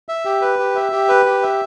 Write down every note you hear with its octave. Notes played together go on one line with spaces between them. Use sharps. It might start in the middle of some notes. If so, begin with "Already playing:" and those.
E5
G4
B4
G4
E5
G4
B4
G4
E5